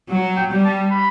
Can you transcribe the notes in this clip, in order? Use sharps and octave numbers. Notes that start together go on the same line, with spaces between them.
F#3
G5
G3
A5
B5